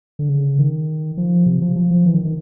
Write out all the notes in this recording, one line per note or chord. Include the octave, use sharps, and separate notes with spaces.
D3
C#3
D#3
F3
C3
F3
F3
F3
E3
D#3
D#3